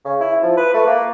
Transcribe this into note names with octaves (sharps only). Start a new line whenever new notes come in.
C#3
E4
F3
B4
A3
A#3